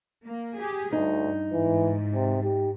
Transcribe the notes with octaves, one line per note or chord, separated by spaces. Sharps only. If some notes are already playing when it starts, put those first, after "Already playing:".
A#3
G4 G#4
D2 G2 D#4
G#2 E3
C3
G4